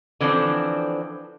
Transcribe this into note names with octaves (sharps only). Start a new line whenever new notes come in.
D3 E3 F3 C4 D4